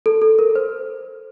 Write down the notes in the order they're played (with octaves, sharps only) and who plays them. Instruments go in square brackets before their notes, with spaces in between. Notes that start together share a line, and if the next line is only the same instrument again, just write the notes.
[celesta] A4
A4
A#4
C5